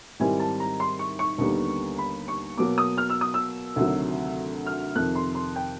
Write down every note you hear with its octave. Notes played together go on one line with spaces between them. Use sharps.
G#2 D#3 G3 C4 E4 G#5
A5
A#5
C6
C#6
C#6
D#2 D3 G3 B3 D#4
B5
C#6
B2 F#3 A#3 D6
D#6
F6
E6
D#6
E6
D2 C3 D#3 F#3
F6
F2 C3 D#3 F#6
C6
C6
G5